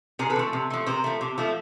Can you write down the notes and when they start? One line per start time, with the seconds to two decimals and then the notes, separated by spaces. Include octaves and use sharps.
0.19 C3 G#4 A#4
0.30 A4 B4
0.36 F3 A3
0.53 C3
0.70 F3 A3
0.86 C3 A#4 C5
1.04 F3 A3
1.21 C3
1.38 F3 A3